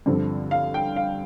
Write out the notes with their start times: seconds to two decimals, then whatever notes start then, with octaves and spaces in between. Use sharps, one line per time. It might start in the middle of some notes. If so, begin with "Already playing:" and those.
0.06 G2 D3 F3 C4
0.51 F5
0.74 G5
0.96 F5